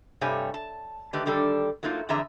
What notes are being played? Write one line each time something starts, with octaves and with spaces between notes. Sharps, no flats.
G2 C3 G3 A3 C#5 G#5
A5
D3 D#3 A3 G4 B4
D3 D#3 G3 D4 A4
F#3 A3 A#3 D#4 F4
F2 D3 E3 G#4 E5 A#5